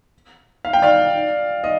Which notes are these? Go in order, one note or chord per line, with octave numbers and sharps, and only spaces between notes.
F5
G5
D5 F5
D#5